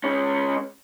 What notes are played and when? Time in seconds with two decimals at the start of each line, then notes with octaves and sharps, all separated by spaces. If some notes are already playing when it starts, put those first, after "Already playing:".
0.04 G#3 C#4